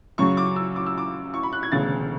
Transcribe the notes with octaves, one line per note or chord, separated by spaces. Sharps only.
F#2 C#3 F#3 C#6
D6
E6
D6
E6
D6
C#6
B5
F#6
G#6
E1 D2 C#3 A6